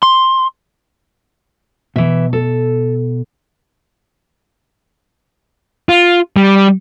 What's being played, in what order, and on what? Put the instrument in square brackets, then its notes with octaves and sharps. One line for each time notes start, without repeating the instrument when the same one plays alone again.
[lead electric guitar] C6
[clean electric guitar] B2 [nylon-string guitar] E3 E5
[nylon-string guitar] A4
[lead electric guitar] F4
G3